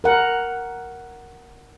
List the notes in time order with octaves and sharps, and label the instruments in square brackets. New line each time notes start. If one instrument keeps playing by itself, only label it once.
[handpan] A#4 F#5